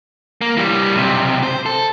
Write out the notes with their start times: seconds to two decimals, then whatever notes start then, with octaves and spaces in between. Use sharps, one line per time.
0.41 A#3
0.57 E3 G3
0.95 B1 C3
1.43 C5
1.66 A4